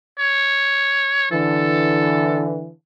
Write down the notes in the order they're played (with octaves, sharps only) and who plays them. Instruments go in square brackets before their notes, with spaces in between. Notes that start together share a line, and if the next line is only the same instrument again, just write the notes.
[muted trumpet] C#5
[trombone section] D3 E3 [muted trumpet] A4